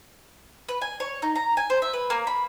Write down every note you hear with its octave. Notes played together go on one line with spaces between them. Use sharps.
B4
G#5
C#5
D#4
A#5
G#5
C5
E5
B4
A#3
B5